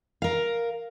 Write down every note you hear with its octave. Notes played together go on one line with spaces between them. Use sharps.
A#4 F5